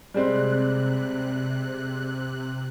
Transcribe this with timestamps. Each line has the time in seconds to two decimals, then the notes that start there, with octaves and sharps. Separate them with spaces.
0.14 C3 G3 G#3 C4 F#6